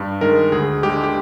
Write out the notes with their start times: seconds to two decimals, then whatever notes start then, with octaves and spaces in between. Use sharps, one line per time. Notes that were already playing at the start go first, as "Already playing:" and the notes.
Already playing: G2
0.21 D#3 G#3 A#4
0.52 D2 G#4
0.83 D3 G#3 G4
1.03 G4